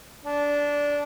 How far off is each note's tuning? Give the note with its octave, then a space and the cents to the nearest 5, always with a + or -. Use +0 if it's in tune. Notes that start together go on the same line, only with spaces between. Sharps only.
D4 -15